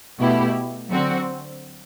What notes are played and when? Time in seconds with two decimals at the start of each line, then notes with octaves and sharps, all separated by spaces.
0.18 B2 A3 E4 G4
0.89 D3 F#3 C4 F#4